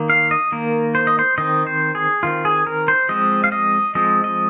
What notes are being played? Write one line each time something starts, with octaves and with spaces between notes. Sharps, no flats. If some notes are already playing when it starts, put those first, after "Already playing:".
Already playing: D#3 A#3
F5
D#5
D#3 A#3 A#4
C5
D#5
C5
D#3 C4 D#5
C5
G#4
D#3 C4 F4
G#4
A#4
C5
F3 G#3 C4 D#5
F5
D#5
F3 G#3 C4 D#5
D#5